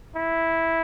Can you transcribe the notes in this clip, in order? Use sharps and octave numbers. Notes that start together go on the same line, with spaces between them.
E4